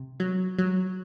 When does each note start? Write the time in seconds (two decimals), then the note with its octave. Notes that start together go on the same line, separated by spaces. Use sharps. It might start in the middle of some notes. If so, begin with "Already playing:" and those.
Already playing: C3
0.20 F#3
0.59 F#3